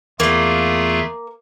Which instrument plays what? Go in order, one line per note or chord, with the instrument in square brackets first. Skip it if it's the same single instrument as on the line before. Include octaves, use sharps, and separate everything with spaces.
[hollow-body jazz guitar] E2 [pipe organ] A3 F4 G#4 [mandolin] A#3